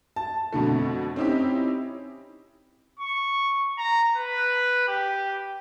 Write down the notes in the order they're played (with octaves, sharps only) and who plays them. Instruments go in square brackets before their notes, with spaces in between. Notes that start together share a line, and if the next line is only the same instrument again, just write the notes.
[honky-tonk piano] A5
F2 B2 D3 A3
C4 C#4 D#4 E4 G4
[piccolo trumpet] C#6
A#5
B4
G4